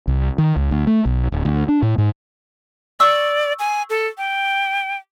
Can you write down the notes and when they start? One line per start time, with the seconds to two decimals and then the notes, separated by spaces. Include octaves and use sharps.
0.08 C2
0.38 D#3
0.56 C#2
0.71 D2
0.87 A3
1.06 B1
1.32 D1
1.45 D2
1.68 D4
1.82 A2
1.98 G#2
3.00 D5 C#6 E6
3.59 G#5
3.90 A4
4.18 G5